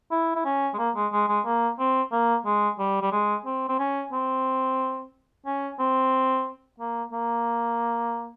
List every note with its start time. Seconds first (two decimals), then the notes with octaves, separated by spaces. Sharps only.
0.12 E4
0.36 E4
0.45 C#4
0.74 G#3
0.79 A#3
0.95 G#3
1.12 G#3
1.28 G#3
1.45 A#3
1.79 C4
2.12 A#3
2.45 G#3
2.79 G3
3.02 G3
3.12 G#3
3.46 C4
3.69 C4
3.79 C#4
4.13 C4
5.46 C#4
5.79 C4
6.80 A#3
7.12 A#3